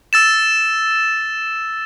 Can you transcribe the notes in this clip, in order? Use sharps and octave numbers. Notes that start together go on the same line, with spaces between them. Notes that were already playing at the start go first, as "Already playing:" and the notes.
E6 A6 E7